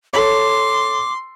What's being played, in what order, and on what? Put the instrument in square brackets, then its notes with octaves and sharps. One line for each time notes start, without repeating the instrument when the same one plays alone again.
[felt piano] A4 C#5 [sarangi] C6 [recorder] D6